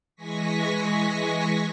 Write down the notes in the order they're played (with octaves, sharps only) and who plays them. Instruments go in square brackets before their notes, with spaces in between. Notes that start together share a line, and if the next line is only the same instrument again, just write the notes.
[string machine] E3 G#3 G#5 C#6 A#6 B6